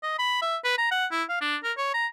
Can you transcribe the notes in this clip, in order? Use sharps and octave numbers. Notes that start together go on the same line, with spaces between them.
D#5
B5
E5
B4
A#5
F#5
E4
F5
D4
A#4
C#5
A#5